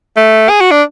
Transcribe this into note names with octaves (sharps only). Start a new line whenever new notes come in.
A3
G#4
F#4
D4